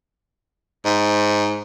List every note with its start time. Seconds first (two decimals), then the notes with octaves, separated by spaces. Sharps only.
0.85 G#2